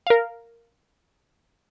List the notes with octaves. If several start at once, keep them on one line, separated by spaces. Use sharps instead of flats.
A#4 F5